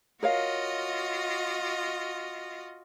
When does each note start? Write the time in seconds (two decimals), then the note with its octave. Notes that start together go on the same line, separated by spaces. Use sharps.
0.23 F4 F#4 A#4 C#5 D#5 F5